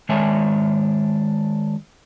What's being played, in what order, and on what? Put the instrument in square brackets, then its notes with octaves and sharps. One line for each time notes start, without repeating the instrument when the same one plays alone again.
[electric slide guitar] D#3 G#3 D4 C#5 E5 G#5